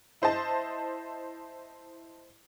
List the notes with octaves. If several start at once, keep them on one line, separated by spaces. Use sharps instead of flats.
E4 C5 D#5 A5